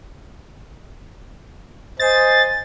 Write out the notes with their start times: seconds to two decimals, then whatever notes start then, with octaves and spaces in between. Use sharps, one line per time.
2.00 C5 D#5 G#5 A6